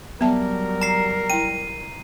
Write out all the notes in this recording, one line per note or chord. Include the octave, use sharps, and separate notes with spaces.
F#3 G3 B3 A#4 E5 A5
A#5 C7
E4 G5 D#7